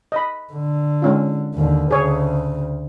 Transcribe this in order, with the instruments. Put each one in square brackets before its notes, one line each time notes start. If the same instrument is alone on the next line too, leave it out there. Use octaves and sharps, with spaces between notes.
[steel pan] D#5 B5
[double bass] D3
[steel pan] G#3 C#4 F4
[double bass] D#2 D3
[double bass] D2 C#3 [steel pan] G#4 C#5